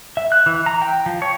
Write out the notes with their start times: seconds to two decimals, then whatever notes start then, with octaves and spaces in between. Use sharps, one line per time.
0.17 E5
0.32 F#6
0.46 E3
0.66 A#5
0.82 G5
1.06 F3
1.22 C#5